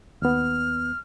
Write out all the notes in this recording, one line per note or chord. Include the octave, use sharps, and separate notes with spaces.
D#2 B3 F6